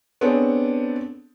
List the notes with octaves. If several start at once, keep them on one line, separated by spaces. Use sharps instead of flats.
B3 C4 D4 G#4 A4 C#5